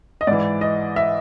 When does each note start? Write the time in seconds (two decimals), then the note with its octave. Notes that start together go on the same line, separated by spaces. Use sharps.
0.21 D#5
0.27 G#2 E3 D5
0.61 D#5
0.96 E5